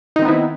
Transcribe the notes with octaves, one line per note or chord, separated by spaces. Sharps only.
D#3 B3 C4 D#4 E4